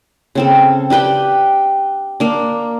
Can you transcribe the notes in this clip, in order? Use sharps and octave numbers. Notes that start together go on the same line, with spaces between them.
C#3 C4 A4
D4 G4 B4 G5
A#3 D4